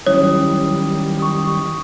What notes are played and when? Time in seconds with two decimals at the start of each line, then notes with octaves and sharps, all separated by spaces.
0.07 D#3 F#3 G3 C#4 E4 C#5 D#6
1.20 C#6 D#6